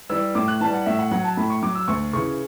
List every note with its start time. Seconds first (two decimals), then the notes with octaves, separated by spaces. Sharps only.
0.10 E3 G3 E6
0.35 A2 D6
0.48 F#6
0.61 E3 G3 A5
0.73 F#5
0.86 A2 E5
0.99 F#5
1.11 F#3 F#5
1.24 A5
1.37 A2 B5
1.50 C#6
1.62 F#3 D6
1.75 E6
1.88 D2 C#6
2.13 C#3 E3 C#6